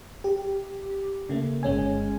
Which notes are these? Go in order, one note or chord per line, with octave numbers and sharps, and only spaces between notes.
G4
C#3 A3 A#3
G1 G#3 C#4 G#5